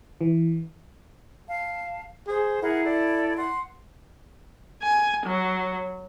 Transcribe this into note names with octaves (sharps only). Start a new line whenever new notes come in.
E3
F5 A5
G#4 C5
E4 G#4 A#4 F#5
A4 D5
F#5 C6
G#5
F#3